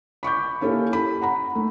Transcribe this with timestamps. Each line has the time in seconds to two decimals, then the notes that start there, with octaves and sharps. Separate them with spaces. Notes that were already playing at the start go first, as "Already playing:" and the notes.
0.23 B5 C#6 D6 G6
0.61 A#3 C#4 E4 G4 A4
0.93 B5
1.22 F#5 A#5 B5
1.55 A3